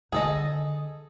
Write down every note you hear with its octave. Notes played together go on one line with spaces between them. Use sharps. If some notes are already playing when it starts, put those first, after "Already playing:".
D3 D#3 G#4 A4 D#5